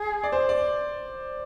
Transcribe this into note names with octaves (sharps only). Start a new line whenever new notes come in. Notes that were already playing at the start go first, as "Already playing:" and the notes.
Already playing: G#4
D5
C5
D5